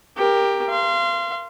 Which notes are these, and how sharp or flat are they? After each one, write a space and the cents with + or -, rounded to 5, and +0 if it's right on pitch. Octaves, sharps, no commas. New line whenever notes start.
G4 +15 A#4 +5
F5 -30 C6 +0